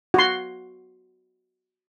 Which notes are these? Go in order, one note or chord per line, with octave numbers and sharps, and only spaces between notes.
F#4 C6